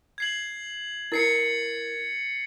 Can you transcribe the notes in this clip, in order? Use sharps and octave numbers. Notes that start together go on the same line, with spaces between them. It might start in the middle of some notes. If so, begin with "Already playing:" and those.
G#6 C7 F#7
E4 A#4 A6 C7 C#7